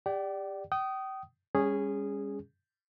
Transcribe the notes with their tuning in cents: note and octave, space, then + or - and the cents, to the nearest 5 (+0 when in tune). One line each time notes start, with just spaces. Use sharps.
G4 +25 D5 +0 G5 -40
G5 -35 D#6 +0
G3 +35 C#4 +0 G#4 -10